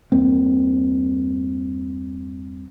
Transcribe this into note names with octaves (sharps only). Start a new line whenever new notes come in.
E2 G2 A#3 C4